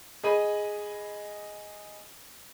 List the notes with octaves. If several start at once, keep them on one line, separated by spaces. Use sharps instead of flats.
G#4 D#5 B5 D#7